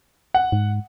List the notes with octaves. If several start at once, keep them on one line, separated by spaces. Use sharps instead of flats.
F#5
G#2